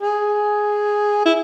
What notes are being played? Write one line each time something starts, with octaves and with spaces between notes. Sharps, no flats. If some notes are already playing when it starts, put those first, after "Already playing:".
G#4
E4